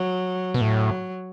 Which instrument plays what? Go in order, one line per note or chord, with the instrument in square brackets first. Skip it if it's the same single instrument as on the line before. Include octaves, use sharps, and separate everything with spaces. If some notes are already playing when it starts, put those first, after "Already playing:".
Already playing: [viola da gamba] F#3
[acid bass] B2
[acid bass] A2 [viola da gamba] F#3